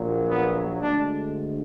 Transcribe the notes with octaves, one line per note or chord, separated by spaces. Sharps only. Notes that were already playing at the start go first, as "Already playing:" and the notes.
Already playing: A#1 A#2 F#3
B3
D2 D3 G#3 D4